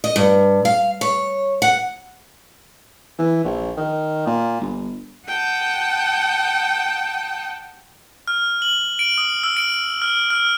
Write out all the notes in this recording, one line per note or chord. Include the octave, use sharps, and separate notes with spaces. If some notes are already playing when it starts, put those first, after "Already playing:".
D#5
G2
F5
C#5
F#5
E3
A#1
D#3
A#2
G1
F#5 G5 A5 D#6
F6
F#7
D7
D#6
E6
D7
F6
F6